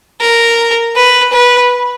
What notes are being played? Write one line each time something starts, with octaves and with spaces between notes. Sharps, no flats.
A#4
B4
B4